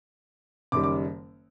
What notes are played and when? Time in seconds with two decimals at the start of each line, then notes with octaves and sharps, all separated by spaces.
0.72 F#1 F#2 D#3 G3 D6
0.84 D6